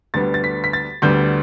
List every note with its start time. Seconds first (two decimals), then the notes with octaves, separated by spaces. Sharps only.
0.14 D2 D3 G3 B3 A6
0.34 A6
0.44 B6
0.64 B6
0.73 A6
1.02 D2 D3 G3 B3 G6